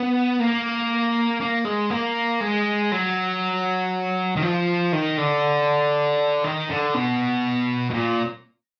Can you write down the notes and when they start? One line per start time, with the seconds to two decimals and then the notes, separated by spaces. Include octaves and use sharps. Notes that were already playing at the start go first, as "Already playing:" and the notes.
Already playing: B3
0.40 A#3
1.41 A#3
1.65 G#3
1.90 A#3
2.41 G#3
2.92 F#3
4.36 D#3
4.42 F3
4.93 D#3
5.18 D3
6.44 D#3
6.70 D3
6.94 B2
7.91 B2
7.94 A#2